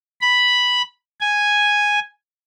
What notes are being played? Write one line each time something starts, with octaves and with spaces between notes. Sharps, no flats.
B5
G#5